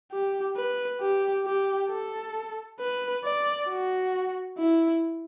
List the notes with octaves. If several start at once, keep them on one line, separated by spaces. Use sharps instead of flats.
G4
B4
G4
G4
A4
B4
D5
F#4
E4